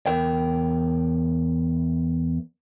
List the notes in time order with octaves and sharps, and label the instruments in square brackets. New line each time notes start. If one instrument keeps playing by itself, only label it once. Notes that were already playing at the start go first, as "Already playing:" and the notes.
[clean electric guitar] E2 A#4 G5